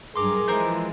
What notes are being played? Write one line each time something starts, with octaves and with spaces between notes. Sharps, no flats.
G2 F#3 G#4 A#4 C6 D6
E3 F3 G#3 C4 A#4 G6